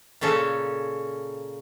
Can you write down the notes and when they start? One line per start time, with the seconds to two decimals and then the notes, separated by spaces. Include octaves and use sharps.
0.21 A#2 C#3 C#4 A4